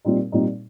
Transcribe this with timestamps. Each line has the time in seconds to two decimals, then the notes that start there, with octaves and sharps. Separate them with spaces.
0.05 A#2 G3 C4 D#4
0.32 A#2 G3 C4 D#4